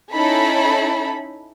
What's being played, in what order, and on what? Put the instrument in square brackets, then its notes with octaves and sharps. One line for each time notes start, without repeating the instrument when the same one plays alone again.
[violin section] C#4 D#4 E4 A4 B5